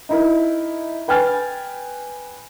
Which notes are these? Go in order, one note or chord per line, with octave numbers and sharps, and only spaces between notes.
D#4 E4 A#4
B4 G5 G#5 F6 A6